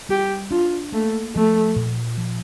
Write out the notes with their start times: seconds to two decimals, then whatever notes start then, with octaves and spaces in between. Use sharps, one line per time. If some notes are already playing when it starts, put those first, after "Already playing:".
0.09 G3 G4
0.51 D4 F4
0.92 A3 A#3
1.35 F3 A3
1.76 A#2
2.18 F3